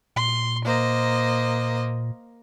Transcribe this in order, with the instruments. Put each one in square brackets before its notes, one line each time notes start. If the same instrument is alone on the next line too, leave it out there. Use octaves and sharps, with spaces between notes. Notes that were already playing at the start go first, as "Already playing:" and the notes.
[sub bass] A#2 [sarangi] C6
[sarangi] A#3 [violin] C5 D#5